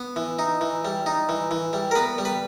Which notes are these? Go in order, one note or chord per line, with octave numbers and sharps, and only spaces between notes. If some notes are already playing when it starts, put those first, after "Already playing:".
Already playing: B3
E3
D#4
E3
G3
D#4
E3
E3
G3
A#4
B3 B4
G3
B4